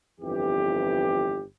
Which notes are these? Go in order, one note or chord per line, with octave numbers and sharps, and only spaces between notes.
G1 F2 E3 G4